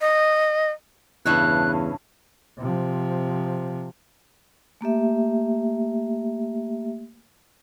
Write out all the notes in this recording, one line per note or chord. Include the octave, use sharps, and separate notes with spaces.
D#5
E2 G2 C#3 E4 F#6
C3 F3
A3 A#3 G4 E5